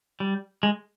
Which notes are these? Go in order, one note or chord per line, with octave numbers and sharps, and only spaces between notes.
G3
G#3